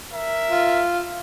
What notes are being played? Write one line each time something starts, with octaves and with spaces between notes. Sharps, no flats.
A#4 E5
F4